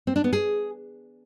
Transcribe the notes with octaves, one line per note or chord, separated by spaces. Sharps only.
C4
D4
B3
G#4